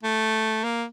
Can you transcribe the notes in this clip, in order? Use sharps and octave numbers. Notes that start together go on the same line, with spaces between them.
A3
A#3